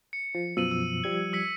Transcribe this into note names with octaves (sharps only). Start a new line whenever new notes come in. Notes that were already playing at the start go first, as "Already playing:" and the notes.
C#7
F3
F#2 B2 F3 E6 D#7 F#7
E6
F3 G3 G#6
E6 B6 C#7